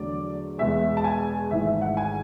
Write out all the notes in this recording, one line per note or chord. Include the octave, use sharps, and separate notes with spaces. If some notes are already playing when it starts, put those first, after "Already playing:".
Already playing: E2 D3 F#3 A3 D5
E2 B2 G#3 E5
A5
G#5
G#1 G#2 E3 A3 E5
E5
F#5
G#5